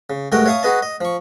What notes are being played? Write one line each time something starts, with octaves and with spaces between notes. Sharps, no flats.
C#3
G2 G#3 A3 F#4 A#4 G5
C#5 E5 F5 A5 C#6 D#6
F#4 G#4 B4 D#5 A5
D#5
F3 C#6